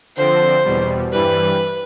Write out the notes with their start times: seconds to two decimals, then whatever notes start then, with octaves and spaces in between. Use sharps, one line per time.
0.17 D3 F3 C4 C5
0.64 E2 B2 G3
1.11 G2 E3 G3 B4